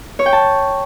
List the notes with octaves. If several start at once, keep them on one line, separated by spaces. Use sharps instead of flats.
C#5
G5
A5